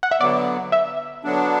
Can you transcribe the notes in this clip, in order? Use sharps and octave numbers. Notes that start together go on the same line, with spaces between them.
F#5
E5
D3 F#3 B3 D5
E5
D3 F#3 B3 D4